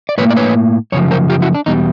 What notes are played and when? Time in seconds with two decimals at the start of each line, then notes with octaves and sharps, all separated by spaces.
0.09 D5
0.18 A2 F#3 A#3 B4 C#5
0.30 D5
0.36 B4 C#5
0.92 F#2 C#3 F3 C#5
1.11 A#4 C5
1.30 F4 G4
1.42 E4 F#4
1.55 D4
1.66 E2 B2 G3 D#4